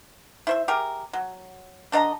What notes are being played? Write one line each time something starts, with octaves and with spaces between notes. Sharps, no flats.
E4 C5 E5
G4 G#4 A#4
F#3
D3 D4 D#5 A#5